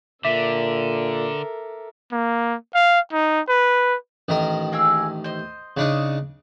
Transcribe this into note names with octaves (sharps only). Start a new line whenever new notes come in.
A#2 D3 A4 A#4 E5 D6 B6
A#3
F5
D#4
B4
A1 D#3 A#4
A#3 G#4 E6
C5 D#5
C#3 D4 D#4